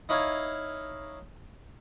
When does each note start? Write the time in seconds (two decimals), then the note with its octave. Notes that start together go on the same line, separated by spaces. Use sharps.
0.09 D#4 E4 C#5 F5